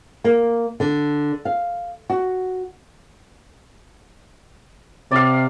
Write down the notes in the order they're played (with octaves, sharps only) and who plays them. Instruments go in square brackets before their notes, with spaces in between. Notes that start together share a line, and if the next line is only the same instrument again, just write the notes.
[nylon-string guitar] A#3
D3
F5
F#4
[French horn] C3 [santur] D5 F5